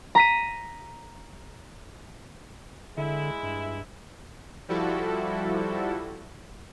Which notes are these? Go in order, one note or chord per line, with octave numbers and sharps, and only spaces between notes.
A#5 B6 D#7
D3 G#3 E4
G2
F3 G3 E4 F#4 A4